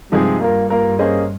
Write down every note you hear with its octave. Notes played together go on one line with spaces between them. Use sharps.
G2 C3 F3 G#3 D#4 G#4
G2 A#3 F4 A#4
A#3 F4 A#4
A#3 C#4 G#4 C5 D#5